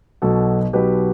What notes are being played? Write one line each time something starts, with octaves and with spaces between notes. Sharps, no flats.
B1 B2 F#3 F#4 A4
B1 B2 F#3 G4 B4